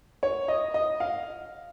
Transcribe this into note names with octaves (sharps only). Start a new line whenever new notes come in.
C#5
D#5
D#5
F5